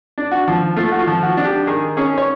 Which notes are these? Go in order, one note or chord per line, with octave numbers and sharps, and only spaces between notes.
D4
F#4
F3
A3 F4
F#4
F4
F3
F#4
D4
G4
D#3 G#4
C#4 G#4
C#5